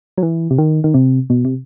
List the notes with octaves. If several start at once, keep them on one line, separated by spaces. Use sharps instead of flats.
F#3
E3
C3
D#3
D#3
C3
B2
C3